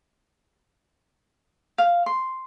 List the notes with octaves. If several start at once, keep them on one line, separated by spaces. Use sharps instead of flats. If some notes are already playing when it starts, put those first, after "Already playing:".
F5
C6